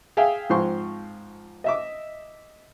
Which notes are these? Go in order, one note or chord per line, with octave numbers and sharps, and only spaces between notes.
G#4 E5 F5 G5 G#5
G#2 F3 C4 C5 C6 C#6
D#5 E5 D6